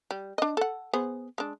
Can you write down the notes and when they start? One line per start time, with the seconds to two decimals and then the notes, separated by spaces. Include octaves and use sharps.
0.11 G3
0.38 D4 D#5
0.57 A4 F#5
0.93 B3 G#4 C5
1.38 G#3 D4